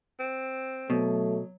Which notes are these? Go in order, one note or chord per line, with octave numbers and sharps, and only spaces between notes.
C4
B2 F#3 A3